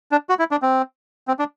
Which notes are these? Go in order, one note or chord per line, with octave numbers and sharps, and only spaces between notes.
D4
F#4
E4
D4
C4
C4
D4